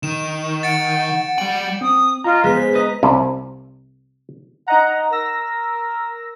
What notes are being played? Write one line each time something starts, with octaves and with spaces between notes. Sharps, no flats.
D#3 E7
F#5 A6 C#7 D7
G3 G5 F#7
C4 D#6
F4 D#5 F5 A#5
G#3 B3 B6
G#4 C5
B4 D#5 A#5
C2 C3
D#4 D#5 F#5 A#5
A#4 E6 A#6